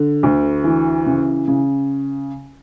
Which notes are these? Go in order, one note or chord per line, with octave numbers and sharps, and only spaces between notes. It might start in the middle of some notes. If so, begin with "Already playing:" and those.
Already playing: D3
D2
E3
C#3
C#3